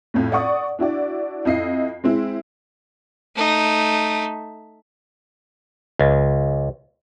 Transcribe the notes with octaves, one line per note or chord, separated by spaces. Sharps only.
F2 A2 A3
D5 F#5 C#6 D#6
D4 E4 F#4 D5
F2 E4 D#5 C7
G#3 C4 E4
A3 D#4
C#2